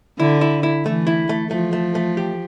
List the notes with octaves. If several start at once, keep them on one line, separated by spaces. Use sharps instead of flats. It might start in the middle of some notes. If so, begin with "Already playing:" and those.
D3 E4
E4
E4
E3 A3
E4
A3
F3 A3
A3
A3
G4